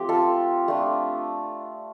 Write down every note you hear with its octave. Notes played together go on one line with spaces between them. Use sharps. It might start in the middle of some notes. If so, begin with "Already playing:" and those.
Already playing: F3 A3 C4 G4
F4 A4
A3 D4 F4